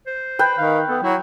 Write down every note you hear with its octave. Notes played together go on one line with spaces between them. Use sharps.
C5
B4 G5
D#3 F5
B3 A4
F#3 E4